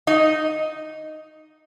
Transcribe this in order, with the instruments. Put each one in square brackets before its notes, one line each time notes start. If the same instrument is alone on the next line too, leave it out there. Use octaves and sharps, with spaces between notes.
[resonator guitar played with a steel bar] D#4 D#5